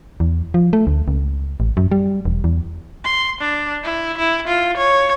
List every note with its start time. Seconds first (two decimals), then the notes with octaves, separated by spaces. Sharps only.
0.20 E2
0.54 F3
0.73 A3
0.87 D2
1.08 C#2
1.60 A1
1.77 F#2
1.92 G3
2.25 E1
2.44 E2
3.04 C6
3.40 D4
3.83 E4
4.17 E4
4.47 F4
4.77 C#5